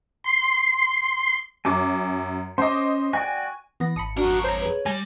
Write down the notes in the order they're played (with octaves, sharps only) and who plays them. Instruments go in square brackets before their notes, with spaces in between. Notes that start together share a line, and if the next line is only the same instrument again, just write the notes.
[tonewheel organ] C6
[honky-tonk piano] F#2 [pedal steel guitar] G#5 D6
[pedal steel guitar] C#4 D6 [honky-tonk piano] C5 D#5
[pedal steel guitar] F#4 D5 G5 [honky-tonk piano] G#5
[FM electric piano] E3 B5 A#6 [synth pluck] B3
[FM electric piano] G#1 A5 C#7 [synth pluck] B5 D#6
[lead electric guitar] F2 A#4 [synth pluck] D4 [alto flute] F#4
[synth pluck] C5 A#5 [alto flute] C#5
[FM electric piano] G#4 B4
[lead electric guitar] G3 [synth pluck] G#5 [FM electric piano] A#6